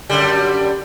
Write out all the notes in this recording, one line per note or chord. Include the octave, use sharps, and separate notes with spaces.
F#2 D3 G3